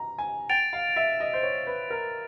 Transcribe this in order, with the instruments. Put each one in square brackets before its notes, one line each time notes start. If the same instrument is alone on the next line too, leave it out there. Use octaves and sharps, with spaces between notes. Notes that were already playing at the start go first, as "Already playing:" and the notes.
Already playing: [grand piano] A#5
G#5
[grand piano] G5 [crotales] A6 D7 F7
[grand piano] F5
E5
D#5
C5
C#5
B4
A#4